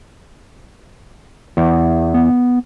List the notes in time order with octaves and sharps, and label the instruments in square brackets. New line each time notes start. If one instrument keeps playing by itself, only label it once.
[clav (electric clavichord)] E2
[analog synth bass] B3